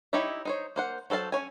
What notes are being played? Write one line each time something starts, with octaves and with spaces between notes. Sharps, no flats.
D#4 E4 G4 C#5 E5
D#4 C5 C#5
A#3 C5 F#5
F#3 A4 C5 F5 A5
C#4 F4 C#5 G#5